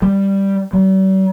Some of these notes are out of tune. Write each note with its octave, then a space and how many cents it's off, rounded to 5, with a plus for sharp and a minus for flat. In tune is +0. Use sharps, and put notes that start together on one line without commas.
G3 +0
G3 -45